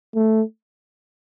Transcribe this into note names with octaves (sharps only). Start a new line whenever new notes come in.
A3